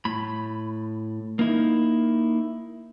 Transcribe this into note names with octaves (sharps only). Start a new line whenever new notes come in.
A2 B5
A#3 D#4 E4